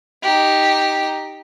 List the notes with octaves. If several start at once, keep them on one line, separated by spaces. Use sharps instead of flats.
D#4 G4